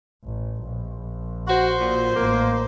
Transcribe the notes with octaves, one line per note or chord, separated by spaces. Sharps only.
A1
A#1
F#4 C5
A#2
A1 A#3